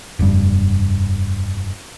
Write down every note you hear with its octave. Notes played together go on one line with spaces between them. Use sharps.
F1 G2